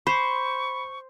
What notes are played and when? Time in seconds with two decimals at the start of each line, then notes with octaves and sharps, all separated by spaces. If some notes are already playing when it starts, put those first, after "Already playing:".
0.07 C5 B5 C#6